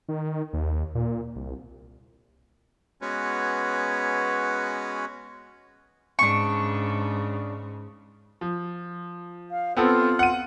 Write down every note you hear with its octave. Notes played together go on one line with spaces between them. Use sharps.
D#3
D#2
A#2
C2
G#3 B3 C#4 F#4 B4 C#5
G#2 C#3 D4 C#6
F3
F5
B3 C4 F4 A4
F#5 D#7